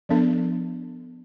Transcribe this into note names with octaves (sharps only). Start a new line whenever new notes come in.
F3 B3 D4 A4